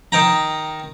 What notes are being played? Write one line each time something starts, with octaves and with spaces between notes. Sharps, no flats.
D#3 G5 A#5